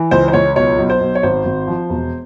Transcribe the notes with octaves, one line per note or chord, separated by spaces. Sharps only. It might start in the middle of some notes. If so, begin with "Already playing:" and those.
Already playing: E3
C#2 C5
C5
C#2 C#5
B1 C#5
B1
C5
B1
C#5
G#1 C5
G#1
F3
E1